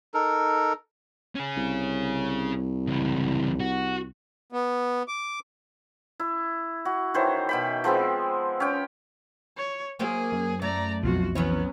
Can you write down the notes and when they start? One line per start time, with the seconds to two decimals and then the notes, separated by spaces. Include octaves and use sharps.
0.14 D#4 A4 A#4
1.36 C#4 G#4
1.57 C2
2.87 C#2 E3
3.60 F#4
4.52 B3
5.08 D6
6.20 E4
6.85 F#4
7.14 D#3 E3 C5 C#5
7.49 B2 G5 B5
7.84 F3 G#3 B3 C4
8.60 C#4 G5
9.57 C#5
9.99 F#3 A#3 G#4 C5
10.32 F#2
10.62 A3 D5 A#5
11.03 B1 F2 B2 F4 F#4
11.35 E3 F#3 B3 C#4 C#5